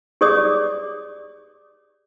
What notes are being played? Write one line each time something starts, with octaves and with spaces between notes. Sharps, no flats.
G4 G#4 C#5 D5 D6 D#6